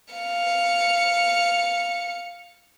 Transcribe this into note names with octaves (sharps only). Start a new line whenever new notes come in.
F5 C#7